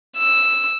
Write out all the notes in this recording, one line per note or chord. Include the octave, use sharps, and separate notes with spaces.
E6